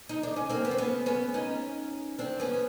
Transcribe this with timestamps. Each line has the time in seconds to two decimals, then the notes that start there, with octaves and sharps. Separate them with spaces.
0.09 D#4
0.23 D4
0.36 C#4
0.49 A#3 C4
0.65 B3
0.71 C4
0.78 B3 C#4
1.06 B3 C#4
1.34 C#4 D#4
2.18 C4 D4
2.40 B3 C#4
2.53 C#4